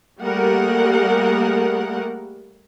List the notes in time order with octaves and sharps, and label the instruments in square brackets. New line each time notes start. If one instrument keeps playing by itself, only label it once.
[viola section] G3 A3 A#3 G#4 A#4 F#5